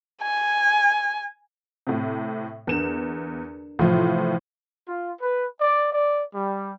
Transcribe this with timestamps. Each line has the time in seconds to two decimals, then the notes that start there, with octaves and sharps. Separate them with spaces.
0.22 G#5
1.87 A2 C3
2.67 E2 D4 A#4 E7
3.79 A2 C3 E3 F3 F4
4.88 F4
5.22 B4
5.61 D5
5.92 D5
6.35 G3